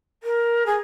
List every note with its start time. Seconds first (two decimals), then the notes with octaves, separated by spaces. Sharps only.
0.23 A#4
0.66 G#4